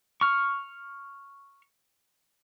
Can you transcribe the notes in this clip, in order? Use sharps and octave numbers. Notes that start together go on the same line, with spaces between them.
C#6 F6